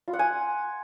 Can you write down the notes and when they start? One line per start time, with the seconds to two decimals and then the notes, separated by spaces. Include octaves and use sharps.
0.08 F4
0.13 F#5
0.19 G#5